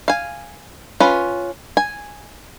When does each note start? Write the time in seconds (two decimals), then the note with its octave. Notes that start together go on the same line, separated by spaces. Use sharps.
0.08 F5 G#5
1.00 C#4 F4 B4
1.77 G#5